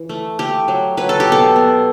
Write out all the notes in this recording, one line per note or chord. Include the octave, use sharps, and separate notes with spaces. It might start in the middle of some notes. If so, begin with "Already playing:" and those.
Already playing: E3
A3
A3 G4
F#3
F#3 B4
A4
G4
B2 A4
B3